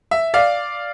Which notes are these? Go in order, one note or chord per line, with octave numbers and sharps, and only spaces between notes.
E5
D5 F5